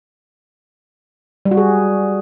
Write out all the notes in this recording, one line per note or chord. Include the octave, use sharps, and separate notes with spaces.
G3
F#4
G#4